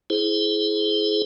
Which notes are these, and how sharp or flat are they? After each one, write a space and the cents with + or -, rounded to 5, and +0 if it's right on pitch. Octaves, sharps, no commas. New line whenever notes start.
E4 +0 G#4 +25 C5 +0